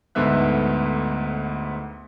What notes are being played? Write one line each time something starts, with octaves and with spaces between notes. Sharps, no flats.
D2 G#2 A3 B3 E5 F#6